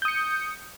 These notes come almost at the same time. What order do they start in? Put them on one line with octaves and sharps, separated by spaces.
G6 D#6 C#7